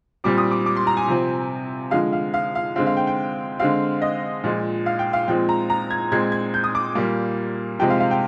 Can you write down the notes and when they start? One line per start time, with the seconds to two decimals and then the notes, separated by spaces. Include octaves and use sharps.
0.24 A#2 G3 C4 D6
0.38 D#6
0.51 D6
0.66 D6
0.76 C6
0.87 A#5
0.97 G#5
1.08 C3 F3 C4
1.91 D3 F3 G#3 F5
2.12 F5
2.34 F5
2.55 F5
2.76 D3 G#3 C4 F5
2.86 F5
2.97 G5
3.07 G5
3.59 D3 G#3 C4 F5
4.02 D#5
4.44 A#2 F3 G#3
4.86 F5
4.99 G5
5.13 F5
5.28 A#2 F3 G#3 C4 G5
5.49 A#5
5.70 A#5
5.90 G#6
6.12 A#2 G#3 C4 G#6
6.32 G#6
6.54 G6
6.64 D#6
6.75 D6
6.95 A#2 G3 A#3
7.79 C3 F3 G#3 C4 G5
7.90 F5
8.00 F5
8.11 G5